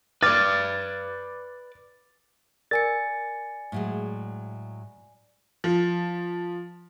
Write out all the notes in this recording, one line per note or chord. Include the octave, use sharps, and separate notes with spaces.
B4 D5 D6 F6 G#6 A6
A#4 D5 G#5 A6 C#7
A2 F#3 G#3
F3